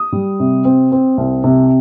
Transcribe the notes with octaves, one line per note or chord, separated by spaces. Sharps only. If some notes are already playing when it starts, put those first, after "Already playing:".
Already playing: D#6
G3
C3
C4
C4
C2
C3